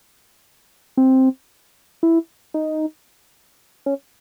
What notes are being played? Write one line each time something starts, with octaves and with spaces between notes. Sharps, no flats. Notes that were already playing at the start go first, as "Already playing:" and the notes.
C4
E4
D#4
C#4